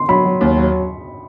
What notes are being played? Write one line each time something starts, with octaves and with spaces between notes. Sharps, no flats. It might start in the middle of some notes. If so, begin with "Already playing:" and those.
Already playing: C6
F#3 B5
F#3
D#2
F#3